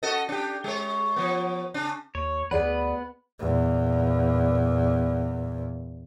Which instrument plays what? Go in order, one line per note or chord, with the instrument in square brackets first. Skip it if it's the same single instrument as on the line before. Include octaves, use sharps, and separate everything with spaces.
[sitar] F#4 A4 D#5
D4 G4
G#3 C#5
F3 B3
C#3 D4
[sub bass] D#2 [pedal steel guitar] C#5
[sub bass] D2 [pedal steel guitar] B3 B4 [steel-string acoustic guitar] G#4 D5 F#5
[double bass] E2 A#2